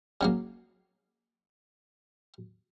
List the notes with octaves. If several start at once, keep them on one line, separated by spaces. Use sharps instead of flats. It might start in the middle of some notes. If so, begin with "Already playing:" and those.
C#3 F#3 A#3